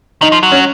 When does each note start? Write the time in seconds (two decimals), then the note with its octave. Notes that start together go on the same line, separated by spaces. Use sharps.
0.22 D#3 D#4
0.32 F3
0.43 F#3
0.52 C#4